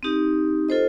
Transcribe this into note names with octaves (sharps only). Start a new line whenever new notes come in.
C4 D#4 G4
F4 A4 C5 D#5